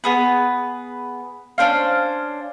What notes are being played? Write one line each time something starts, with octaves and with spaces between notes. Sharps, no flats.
B3 G#4 B4
C#4 D4 C5 F5